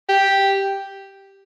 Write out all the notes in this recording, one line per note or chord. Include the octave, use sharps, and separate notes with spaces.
G4